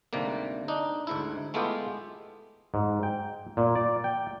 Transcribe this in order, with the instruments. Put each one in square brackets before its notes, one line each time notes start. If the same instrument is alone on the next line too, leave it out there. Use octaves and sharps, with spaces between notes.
[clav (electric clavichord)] D2 G#2 C3 G3 A#3
D4 D#4
D2 G#2 E4
G#3 A3 B3 E4 F4 G4
G#2
G5
A#2
D5
G5